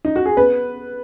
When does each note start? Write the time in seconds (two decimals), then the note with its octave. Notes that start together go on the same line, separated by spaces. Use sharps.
0.05 D#4
0.16 F#4
0.26 G#4
0.37 B3 B4